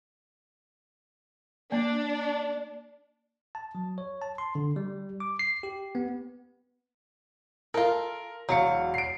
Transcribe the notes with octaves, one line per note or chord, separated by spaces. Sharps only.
A#3 D4
A5
F#3
C#5
A5
C6
D3
G3
D6
C7
G4
B3
F4 A4 A#4
E1 F#3 F5 C#7
C7 D7